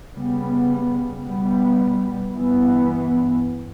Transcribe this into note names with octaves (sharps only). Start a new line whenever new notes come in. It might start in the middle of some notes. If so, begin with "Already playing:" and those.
C#3 G3 B3
B2 G3 B3
G2 E3 B3